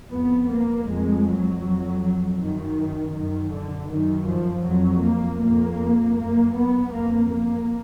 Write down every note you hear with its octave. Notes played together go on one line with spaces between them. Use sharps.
F2 B3
A#3
F2 G#3
F#3
F2
F#2 D#3
F#2 D#3
D3
F#2 D#3
F3
F2 F#3
A#3
F2 A#3
F#2 A#3
B3
F2 A#3
A#3